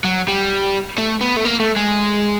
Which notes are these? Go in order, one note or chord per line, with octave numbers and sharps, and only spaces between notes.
F#3
G3
A3
B3
A3
A#3
A3
G#3